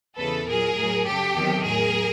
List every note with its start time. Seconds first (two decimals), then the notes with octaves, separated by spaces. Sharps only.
0.17 E2 C#3 E3 A4 B4
0.47 A#2 F#3 G#4 A#4
0.76 A2 F#3
1.06 F#2 C#3 F#3 G4 A4
1.35 E2 C3 D#3 F#3
1.65 A2 F#3 G#4 A#4